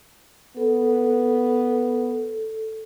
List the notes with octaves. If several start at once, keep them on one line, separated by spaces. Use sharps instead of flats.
B3 A4